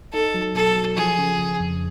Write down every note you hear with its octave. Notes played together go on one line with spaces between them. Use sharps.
D#4 A4
F#3
B2 A4
F#3
F3 G#4
C#3
C#3
F2